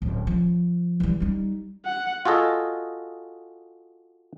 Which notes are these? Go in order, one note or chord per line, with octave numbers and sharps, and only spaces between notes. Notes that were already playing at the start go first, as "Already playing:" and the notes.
D1
F3
E3 G3
G3 D#4
F#5
F4 F#4 G#4 A4 D#5